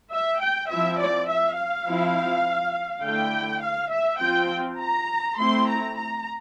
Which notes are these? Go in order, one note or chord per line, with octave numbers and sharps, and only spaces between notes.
E5
G5
F3 C4 E4 E5
D5
E5
F5
F3 C4 E4
D3 A3 E4 G5
F5
E5
F3 C4 F4 G5
A#5
A3 C4 E4 C6
A#5
A#5